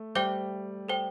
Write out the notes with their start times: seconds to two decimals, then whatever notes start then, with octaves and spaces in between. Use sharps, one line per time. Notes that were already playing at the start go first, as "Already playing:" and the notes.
Already playing: A3
0.15 G3 C5 E5 G5 D6 G6
0.89 A4 C5 G5